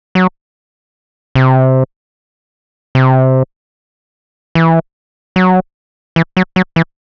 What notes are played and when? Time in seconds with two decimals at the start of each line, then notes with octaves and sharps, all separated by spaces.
0.15 F#3
1.35 C3
2.95 C3
4.55 E3
5.36 F#3
6.16 E3
6.37 F#3
6.56 F#3
6.76 E3